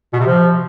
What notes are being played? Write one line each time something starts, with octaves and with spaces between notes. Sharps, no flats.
B2
C3
F3